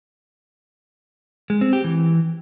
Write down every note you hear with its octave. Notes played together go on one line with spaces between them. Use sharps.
G#3
C4
G4
E3